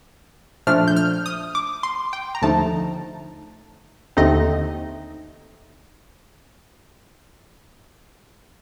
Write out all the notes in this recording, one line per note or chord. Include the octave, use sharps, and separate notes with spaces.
A#2 F3 A3 D4 F6
G6
F6
D#6
D6
C6
G5
A#5
D#2 D3 F3 A3 D#4 A5
D#2 D3 A3 C4 D#4 D#5